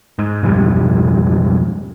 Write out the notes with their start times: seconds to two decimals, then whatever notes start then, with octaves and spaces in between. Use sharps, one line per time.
0.19 G#2
0.43 B1 F2 G#2 G3